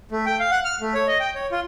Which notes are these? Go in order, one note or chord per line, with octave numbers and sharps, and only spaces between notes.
A3
G5
F5
F#5
F6
A3
C#5
D#5
G5
C#5
F4